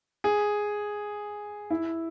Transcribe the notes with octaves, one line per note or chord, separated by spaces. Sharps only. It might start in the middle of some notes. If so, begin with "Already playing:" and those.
G#4
E4